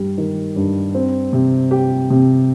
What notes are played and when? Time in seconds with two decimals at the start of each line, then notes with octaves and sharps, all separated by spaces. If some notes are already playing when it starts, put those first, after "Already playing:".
Already playing: G2 G3
0.18 D#3
0.56 G2
0.95 C4
1.33 C3
1.71 G4
2.10 C3